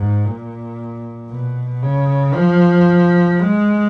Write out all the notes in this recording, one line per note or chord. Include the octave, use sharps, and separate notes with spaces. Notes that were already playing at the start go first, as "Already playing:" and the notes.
Already playing: G#2
A#2
B2
C#3
F3
G#3